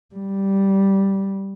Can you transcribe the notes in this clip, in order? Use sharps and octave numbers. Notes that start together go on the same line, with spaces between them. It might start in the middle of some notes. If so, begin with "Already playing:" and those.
G3